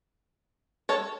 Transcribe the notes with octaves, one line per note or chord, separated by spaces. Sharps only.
A4 C#5